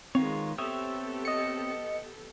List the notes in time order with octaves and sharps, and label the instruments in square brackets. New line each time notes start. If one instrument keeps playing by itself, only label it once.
[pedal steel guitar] D#3 F4 C#5 [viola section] G#3 B3 [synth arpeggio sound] C4
[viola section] B3 G4 A4 [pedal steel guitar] C4 C#5 E5 [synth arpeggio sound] D#6
[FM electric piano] D#5 C#7